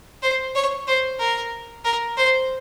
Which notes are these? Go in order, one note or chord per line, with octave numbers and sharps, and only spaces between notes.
C5
C#5
C5
A#4
A#4
C5